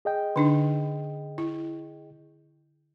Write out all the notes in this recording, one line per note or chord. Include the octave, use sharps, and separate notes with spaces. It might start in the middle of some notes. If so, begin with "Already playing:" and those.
G#4 D#5 G5
D3 D4 D#4
E4